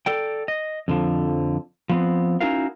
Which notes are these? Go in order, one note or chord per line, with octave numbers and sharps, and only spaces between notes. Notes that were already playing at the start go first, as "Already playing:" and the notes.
A4 D5 G5
D#5
F2 D3 F3
F3 B3 C4
C#4 D#4 E4 F#4 A#4 F5